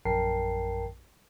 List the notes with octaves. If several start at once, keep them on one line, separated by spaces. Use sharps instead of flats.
A#1 F#2 A#4 G5 A5 C7